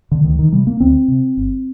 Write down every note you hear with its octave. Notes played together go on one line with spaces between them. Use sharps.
D3
D2 D#3
D#3
C3 G3
A#3
D2 C4
C3
G1